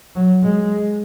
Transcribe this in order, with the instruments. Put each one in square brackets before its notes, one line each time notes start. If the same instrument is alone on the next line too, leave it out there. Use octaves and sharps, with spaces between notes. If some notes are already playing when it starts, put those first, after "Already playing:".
[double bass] F#3
G#3